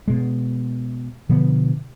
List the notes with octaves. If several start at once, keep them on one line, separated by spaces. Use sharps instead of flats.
B2 G#3
B2 D3 F3 B3